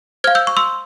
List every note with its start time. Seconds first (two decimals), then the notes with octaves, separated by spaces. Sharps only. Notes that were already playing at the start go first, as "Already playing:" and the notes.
0.24 C5 F6 G#6
0.27 F5
0.35 E6 G6
0.47 C#6
0.57 C6 E6